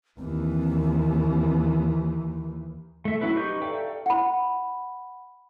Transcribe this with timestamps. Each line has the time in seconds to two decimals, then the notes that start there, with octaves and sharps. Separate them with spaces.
0.19 D#2 E3 C4
3.05 A3 E5
3.21 F#3 C#4 E4 B4
3.36 D#4 G4 B4 C#6 G6
3.62 A4 D5 E5 F5 G5
4.06 F#5 B5